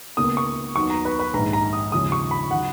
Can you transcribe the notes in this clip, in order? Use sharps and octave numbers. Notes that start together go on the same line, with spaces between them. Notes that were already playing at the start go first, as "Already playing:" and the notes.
C#2 B2 A#3 C#4 D#6
C#6
D#2 D#3 F#3 B3 C#6
A#5
B4
B4
A#1 G#2 D#3 G#3 A#5
A#5
D#6
D#2 C#3 F3 G#3 C#4 D#6
C#6
B5
C#3 F#3 F#5